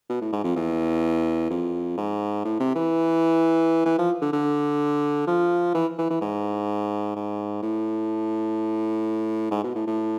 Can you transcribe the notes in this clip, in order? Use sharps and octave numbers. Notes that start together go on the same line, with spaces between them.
B2
A2
G#2
F2
E2
F2
G#2
A2
C3
E3
E3
F3
D3
D3
F3
E3
E3
E3
G#2
G#2
A2
G#2
B2
A2
A2